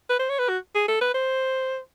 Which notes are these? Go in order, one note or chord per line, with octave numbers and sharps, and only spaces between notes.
B4
C5
C#5
B4
F#4
G#4
A4
B4
C5